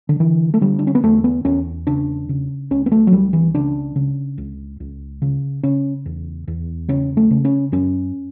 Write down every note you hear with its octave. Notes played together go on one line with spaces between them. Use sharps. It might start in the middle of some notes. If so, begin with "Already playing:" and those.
D3
D3 E3
A3
D3 G3
D4
C#4
B3
E2 A3
B3
E2 C#4
C#3 D4
C#3
C#2 C#4
B3
A3
F#3
C#2 G3
E3
C#3 D4
C#3
C#2
C#2
C#3
C#3 C#4
E2
E2
C#3 C#4
A3
C#3
C#4
F#2 C#4